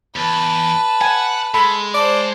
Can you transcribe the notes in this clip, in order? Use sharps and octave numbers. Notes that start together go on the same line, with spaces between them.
E2 B4 A5
F#5 G#5
G#3 A4 B5
C5 D5 A5